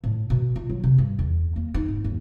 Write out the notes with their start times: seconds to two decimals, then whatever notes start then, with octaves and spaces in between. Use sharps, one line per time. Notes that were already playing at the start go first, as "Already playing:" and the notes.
0.04 A2
0.30 B2
0.56 F4
0.69 F#3
0.84 C3
0.98 G2
1.19 E2
1.56 A#3
1.74 D#4
1.88 G#2
2.04 D#2